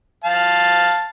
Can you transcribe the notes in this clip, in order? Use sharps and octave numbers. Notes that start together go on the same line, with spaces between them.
F5 A5